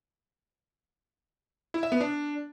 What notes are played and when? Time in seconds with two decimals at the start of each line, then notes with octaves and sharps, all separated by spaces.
1.74 E4
1.83 E5
1.92 B3
2.01 D4